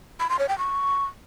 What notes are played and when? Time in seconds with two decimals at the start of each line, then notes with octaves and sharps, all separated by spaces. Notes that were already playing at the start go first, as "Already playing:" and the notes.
0.20 B5
0.30 C6
0.39 C#5
0.49 G5
0.58 C#6